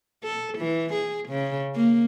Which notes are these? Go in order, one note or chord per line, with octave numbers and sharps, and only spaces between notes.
A4
E3
G#4
C#3
A#3